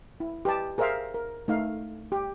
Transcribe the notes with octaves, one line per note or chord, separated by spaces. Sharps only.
E4
G4 B4 D#5 A5
G#4 A#4 C5 E5 F5
A#4
A3 D#4 F5
G4